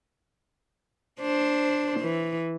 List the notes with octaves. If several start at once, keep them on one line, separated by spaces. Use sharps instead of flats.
D4 C5
E3